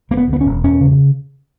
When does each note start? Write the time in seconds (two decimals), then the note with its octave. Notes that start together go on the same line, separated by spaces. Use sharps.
0.11 E1 A#3
0.17 B3
0.28 D2 B3
0.41 C#4
0.46 E1
0.64 E1 C#4
0.81 C#3